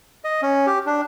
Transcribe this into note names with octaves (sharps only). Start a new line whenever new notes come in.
D#5
C#4
G4
D4